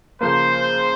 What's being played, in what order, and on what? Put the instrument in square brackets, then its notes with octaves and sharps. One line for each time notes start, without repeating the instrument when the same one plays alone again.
[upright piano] C#3 F3 A#3 [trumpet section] C5